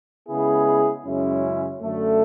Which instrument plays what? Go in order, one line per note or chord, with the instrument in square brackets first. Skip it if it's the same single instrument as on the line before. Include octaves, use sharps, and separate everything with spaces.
[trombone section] C#3 G#3 B3 E4 G#4
F#2 C#3 G#3 C#4 E4
F#2 D3 A3